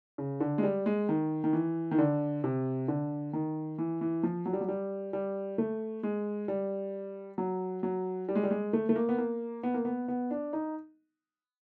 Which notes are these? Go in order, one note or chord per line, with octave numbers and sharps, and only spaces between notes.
C#3
D3
G#3
G3
G#3
D#3
D#3
E3
D#3
D3
C3
D3
D#3
E3
E3
F3
F#3
G3
F#3
G3
G3
A3
G#3
G3
F#3
F#3
G3
G#3
G3
G#3
A3
A3
A#3
B3
A#3
B3
A#3
B3
B3
D4
D#4